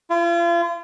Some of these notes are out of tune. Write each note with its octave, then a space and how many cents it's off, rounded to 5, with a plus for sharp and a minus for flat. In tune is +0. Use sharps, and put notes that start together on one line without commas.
F4 -40